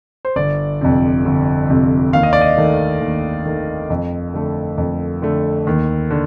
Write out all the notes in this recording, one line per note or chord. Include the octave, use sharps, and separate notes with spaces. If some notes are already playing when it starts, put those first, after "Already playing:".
C5
G1 D5
F2 C3
G1
F2 C3
D#2 F5
D#5
D5
D#5
D#3 A3
D#2
D#3 A3
F2
D3 A3
F2
D3 A3
D#2
D3